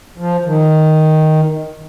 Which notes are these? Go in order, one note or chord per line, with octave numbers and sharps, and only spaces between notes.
F3
D#3